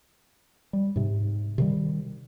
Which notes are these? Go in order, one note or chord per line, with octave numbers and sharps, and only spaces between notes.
G3
G#2 C3
C3 D#3 G3